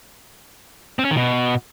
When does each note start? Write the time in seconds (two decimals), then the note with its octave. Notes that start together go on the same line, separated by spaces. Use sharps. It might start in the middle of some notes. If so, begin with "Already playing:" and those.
0.99 C4
1.05 C#4
1.11 D#3
1.17 B2